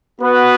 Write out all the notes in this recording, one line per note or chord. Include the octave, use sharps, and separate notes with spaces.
B3 F#4 B4